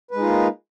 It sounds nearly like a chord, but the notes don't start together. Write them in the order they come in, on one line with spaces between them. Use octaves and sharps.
B4 G#3 D#4 F4 A#3